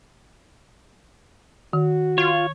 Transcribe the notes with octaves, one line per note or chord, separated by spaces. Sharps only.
D#3 F#4
F4 C#5